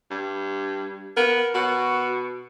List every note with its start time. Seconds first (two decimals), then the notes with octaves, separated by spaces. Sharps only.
0.11 G2
1.17 B3 A#4
1.55 B2 F#4